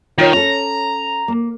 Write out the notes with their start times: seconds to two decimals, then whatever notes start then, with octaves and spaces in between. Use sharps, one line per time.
0.18 D#3 F4 C#5
0.33 C#4 A4 A#5
1.28 A#3